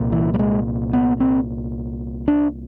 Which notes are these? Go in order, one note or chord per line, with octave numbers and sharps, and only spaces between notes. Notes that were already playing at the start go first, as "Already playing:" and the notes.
Already playing: C2 A#2
E3
G3
G#3
B3
C4
D4